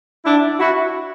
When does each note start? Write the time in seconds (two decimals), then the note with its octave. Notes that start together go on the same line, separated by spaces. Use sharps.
0.25 D4 E4
0.60 E4 F#4